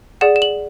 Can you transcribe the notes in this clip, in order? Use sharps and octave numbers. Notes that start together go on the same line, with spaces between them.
G#4 D5 F#5 E7
E7
F#7